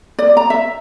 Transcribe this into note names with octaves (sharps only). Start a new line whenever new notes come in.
D5
A#5
E5